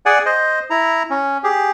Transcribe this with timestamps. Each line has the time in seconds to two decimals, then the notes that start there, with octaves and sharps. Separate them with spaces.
0.06 G#4 D5 F#5 G#5
0.26 C5 D#5
0.70 E4 A#5
1.10 C#4
1.44 G4 G#4